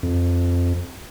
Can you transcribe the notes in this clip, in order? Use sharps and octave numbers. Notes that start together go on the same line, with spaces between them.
F2